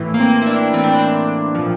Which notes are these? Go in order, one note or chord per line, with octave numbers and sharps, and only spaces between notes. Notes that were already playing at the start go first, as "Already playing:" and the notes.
Already playing: A2 E3
A#3
C4
E4
D4
A2 E3 C4
D4
C4
A#2 F3